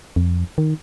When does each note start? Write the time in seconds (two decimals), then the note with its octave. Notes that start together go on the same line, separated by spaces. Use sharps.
0.16 F2
0.58 D#3